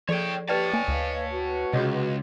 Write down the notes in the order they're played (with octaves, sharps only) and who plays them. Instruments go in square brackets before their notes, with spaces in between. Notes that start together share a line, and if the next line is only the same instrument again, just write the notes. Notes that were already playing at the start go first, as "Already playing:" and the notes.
[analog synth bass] F3 [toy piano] G#4 A4 D5 [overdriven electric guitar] C#5 G5
[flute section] G4 [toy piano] B4 D5 G5 [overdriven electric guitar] C#5 A5
[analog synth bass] A#3 [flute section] D5 [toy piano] G#5
[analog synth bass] D2 [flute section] B4 D#5 F5
[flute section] F#4 B4
[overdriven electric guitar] C#2 [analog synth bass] C3 [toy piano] G#4 C#5 D#5